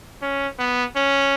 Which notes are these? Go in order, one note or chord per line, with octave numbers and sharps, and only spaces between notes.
C#4
B3
C#4